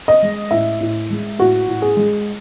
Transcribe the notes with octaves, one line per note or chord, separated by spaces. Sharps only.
D#5
G#3
A2 E5
A2
G#3
A2 F#4
A2
G#4
G#3